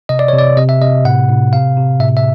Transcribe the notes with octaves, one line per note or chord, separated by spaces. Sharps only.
C3 D#5
D5
C#5
C3 D5
C3 D#5
E5
C3 D#5
A2 F#5
A2
C3 F5
C3
A2 E5
E5